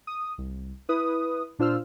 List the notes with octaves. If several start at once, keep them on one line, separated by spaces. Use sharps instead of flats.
D#6
C2
E4 B4 D#6
A#2 D4 F4 C5 E6 F6